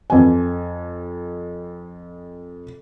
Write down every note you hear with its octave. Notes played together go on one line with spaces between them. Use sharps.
F2 G#5